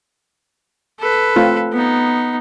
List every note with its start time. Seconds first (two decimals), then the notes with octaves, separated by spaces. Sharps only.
0.99 A4 B4
1.36 A3 C4 F4
1.72 B3 D#4